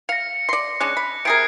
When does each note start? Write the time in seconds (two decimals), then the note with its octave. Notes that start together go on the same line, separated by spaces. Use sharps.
0.09 F5 A#6 C#7
0.49 D5 C6
0.80 G#3 C#4 D4 F#6
0.97 B5
1.25 C3 G#4 A#4 G#6 C7 D7